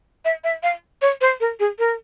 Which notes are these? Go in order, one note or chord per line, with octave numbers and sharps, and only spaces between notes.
E5
E5
F5
C#5
C5
A#4
G#4
A#4